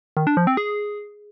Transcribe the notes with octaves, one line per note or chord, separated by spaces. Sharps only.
D#3
D4
F3
C4
G#4